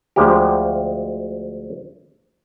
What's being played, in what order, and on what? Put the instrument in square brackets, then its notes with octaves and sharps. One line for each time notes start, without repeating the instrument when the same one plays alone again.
[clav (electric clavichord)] D2 F3 G#3 G4